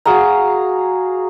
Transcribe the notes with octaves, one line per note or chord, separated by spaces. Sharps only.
F#4 G#4 F5 A#5